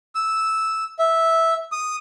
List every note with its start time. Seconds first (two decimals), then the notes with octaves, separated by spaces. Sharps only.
0.15 E6
0.99 E5
1.72 D#6